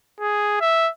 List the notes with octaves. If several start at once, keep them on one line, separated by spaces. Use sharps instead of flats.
G#4
E5